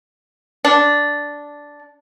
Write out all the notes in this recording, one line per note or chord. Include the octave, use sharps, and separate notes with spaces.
D4